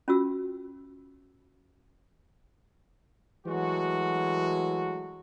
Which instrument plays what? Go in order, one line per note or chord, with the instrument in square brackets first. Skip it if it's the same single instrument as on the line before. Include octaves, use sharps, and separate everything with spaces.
[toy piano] C#4 F4 F#4 E6
[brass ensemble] E3 F#3 G#3 A3 F#4